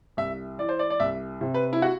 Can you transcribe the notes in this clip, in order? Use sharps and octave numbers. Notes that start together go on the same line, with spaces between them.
C2 E5
E3 D5
C5
D5
D5
C2 E5
C3
B4
E4
F#4